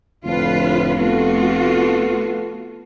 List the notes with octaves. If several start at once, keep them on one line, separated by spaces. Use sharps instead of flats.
F1 A2 D3 F3 F4 B4
A3 B3 F4 F#4 A4